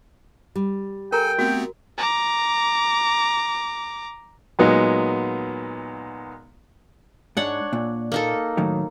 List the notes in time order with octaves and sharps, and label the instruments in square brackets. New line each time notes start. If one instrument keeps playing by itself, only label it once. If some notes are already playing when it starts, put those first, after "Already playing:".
[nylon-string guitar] G3
[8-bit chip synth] A4 G#5 [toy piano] A#4 A#5 [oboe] G5
[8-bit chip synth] A3 B3 C4 [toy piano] F#4
[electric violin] A#5 D6
[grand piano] A#2 F#3 G#3 B3 D#4
[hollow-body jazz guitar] G#2 [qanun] D4 C#5 F#5
[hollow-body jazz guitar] A#2
[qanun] A#3 D#4 A4
[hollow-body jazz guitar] A2 D#3 F#3